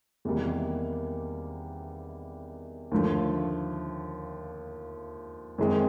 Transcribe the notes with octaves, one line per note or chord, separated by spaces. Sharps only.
E2 C3 D#3 G3 A#3
D#2 D3 F3 A3
F#2 D#3 G#3 C4